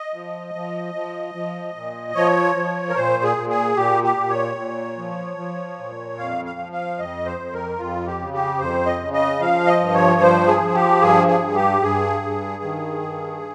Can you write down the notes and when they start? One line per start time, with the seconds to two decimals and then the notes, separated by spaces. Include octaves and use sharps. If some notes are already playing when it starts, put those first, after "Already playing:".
Already playing: D#5
0.14 F3
0.55 F3
0.94 F3
1.34 F3
1.76 A#2
2.15 F3 C#5
2.56 F3
2.89 A#4
2.95 A#2 C5
3.23 G#4
3.37 A#2
3.50 G#4
3.77 A#2 G4
4.04 G4
4.16 A#2
4.30 C#5
4.57 A#2
4.97 F3
5.37 F3
5.78 A#2
6.19 F2 F5
6.45 F5
6.59 F3
6.72 F5
6.98 F2 D#5
7.26 C5
7.40 F2
7.53 A#4
7.79 F2 F4
8.06 G4
8.19 C#3
8.33 G4
8.59 F2 C5
8.86 D#5
9.00 C#3
9.13 D#5
9.40 F3 F5
9.67 D#5
9.80 G2
9.94 C#5
10.21 F3 C5
10.48 G#4
10.61 F3
10.75 G4
11.01 G2 G#4
11.28 G#4
11.42 G2
11.55 G4
11.82 G2 G#4
12.22 G2
12.63 D#3
13.03 G2